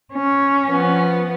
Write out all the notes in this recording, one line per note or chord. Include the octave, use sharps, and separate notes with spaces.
C#4
F3 B3